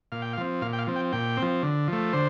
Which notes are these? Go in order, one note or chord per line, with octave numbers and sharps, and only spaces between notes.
A#2 F5
G5
F5
F3 C4
A#2 F5
G5
F5
F3 C4
G5
A#2 G5
F3 C4
D3
F3 A3
D3 C5